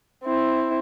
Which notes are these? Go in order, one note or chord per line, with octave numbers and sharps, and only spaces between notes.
C4 E4